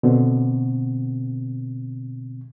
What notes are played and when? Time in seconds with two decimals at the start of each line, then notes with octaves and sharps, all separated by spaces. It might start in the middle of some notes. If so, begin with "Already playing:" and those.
0.03 B2 D3 C4